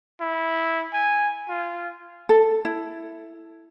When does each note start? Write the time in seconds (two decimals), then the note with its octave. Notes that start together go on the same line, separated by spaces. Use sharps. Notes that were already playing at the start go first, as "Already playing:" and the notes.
0.20 E4
0.93 G#5
1.49 F4
2.29 A4
2.65 E4